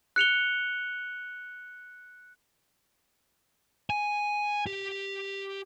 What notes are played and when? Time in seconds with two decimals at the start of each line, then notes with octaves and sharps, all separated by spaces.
0.16 F#6 C#7 F7 G7
3.90 G#5
4.66 G4